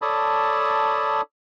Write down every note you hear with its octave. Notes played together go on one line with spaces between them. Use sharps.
A4 C#5 D5 A5 B5 D#6